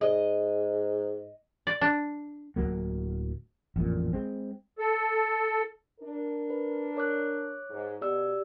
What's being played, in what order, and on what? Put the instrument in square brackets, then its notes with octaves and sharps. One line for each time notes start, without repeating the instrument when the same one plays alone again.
[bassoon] G#2 [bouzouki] D#5
[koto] D5
D4
[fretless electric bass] D1 G#1 F#3 A#3
A1 F2 A#2
G#3 C4
[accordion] A4
[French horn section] D4 A#4
[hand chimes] B4
C#5 D6 F#6
[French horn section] G#2
[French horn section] B2 [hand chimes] G4 D5 E6